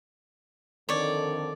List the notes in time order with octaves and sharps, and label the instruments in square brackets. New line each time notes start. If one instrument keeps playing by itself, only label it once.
[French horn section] F2 D3 D#3 [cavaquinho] C#5 D5